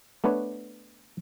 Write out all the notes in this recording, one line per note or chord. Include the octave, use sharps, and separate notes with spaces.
A3 B3 D4 B4 C#5